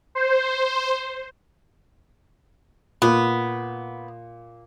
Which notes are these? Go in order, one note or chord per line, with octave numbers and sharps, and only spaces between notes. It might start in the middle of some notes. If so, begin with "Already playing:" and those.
C5
A#2 B3